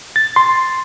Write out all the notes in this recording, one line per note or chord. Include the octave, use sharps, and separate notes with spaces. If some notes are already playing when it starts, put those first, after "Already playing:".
A6
C6